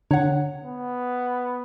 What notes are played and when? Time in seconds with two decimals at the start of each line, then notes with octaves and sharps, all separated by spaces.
0.11 D3 C#5 F#5
0.64 B3